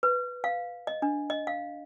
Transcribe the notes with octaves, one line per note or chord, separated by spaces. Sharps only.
B4
F5
D#5
D4
D#5
F5